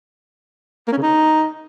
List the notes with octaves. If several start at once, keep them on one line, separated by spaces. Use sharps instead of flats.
A#3
C#4
C#3
D#4